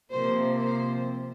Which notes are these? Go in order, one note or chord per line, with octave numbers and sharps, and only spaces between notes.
C3 F3 A#3 C5
C5